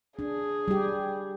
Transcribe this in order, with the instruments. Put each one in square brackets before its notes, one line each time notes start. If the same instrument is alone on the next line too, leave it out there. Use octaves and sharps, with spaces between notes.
[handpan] D4 [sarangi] G#4
[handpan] G3 G4